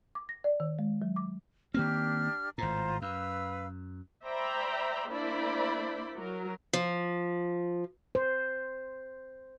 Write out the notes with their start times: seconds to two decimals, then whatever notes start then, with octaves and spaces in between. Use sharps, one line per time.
0.15 D6
0.29 A#6
0.44 D5
0.60 D#3
0.79 G#3
1.02 F#3
1.16 D6
1.74 D#3 A#3 C4 D4 G4 F6
2.58 G#1 A2 F4 C5 A#5
3.02 F#2 B4 F5 E6
4.24 C5 D5 E5 G5 A#5 B5
5.09 A#3 D4 E4 C5 D5 B5
6.16 F#3 A#4
6.73 F3
8.15 C5